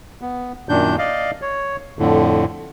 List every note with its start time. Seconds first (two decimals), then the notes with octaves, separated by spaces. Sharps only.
0.21 B3
0.69 F#2 A#2 D#3 D4 G6
0.98 D5 D#5 F5
1.42 C#5
1.99 F2 A2 D3